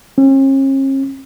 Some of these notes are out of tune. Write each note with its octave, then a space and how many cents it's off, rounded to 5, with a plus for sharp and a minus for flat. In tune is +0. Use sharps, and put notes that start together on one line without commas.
C#4 -45